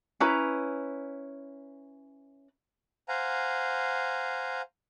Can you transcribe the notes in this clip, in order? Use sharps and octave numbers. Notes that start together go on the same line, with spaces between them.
C#4 E4 B4 A#5
C5 F5 F#5 G#5 A#5